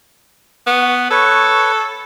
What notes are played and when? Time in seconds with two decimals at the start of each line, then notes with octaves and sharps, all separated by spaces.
0.67 B3 F#5 C#6
1.11 A4 B4 C#5 C#6